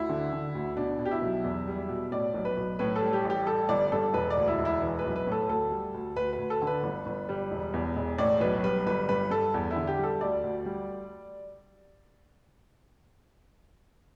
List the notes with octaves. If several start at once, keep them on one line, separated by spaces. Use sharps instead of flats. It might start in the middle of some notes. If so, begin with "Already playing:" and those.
Already playing: D2 E4
D3
D3
D2
B2 D4
B2
G4
E4
B1
E2
G3
B2
A2 D5
B1
B4
B1
A2 B4
A4
G3
G4
A1
G4
G3 A4
G1 D5
G2 A4
E1 B4
D5
D2
E4
E1
E4
E3
B4
B1
B4
A2 A4
D2 A4
G3
D2
D2 B4
B4
D2
A4
D3
B4
G1
G1
G3
E1
E2
E1
A2 D5
B1 B4
G3 B4
G1 B4
G2 B4
G2 A4
E2
E4
D3
G4
G3
A4
D2 D5
D2
G3